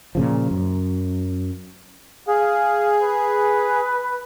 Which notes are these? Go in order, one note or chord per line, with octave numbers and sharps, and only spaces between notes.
A#2 C#3 F3
F#2
G#4 F5
B4